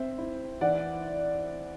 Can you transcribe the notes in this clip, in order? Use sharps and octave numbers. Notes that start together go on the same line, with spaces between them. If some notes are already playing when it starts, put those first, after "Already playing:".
Already playing: C4 C5 E5
E4
E3 D5 F#5